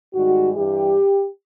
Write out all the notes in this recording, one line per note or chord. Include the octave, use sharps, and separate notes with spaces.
G#2 D#3 G3 F#4
G2 E3 G3 G4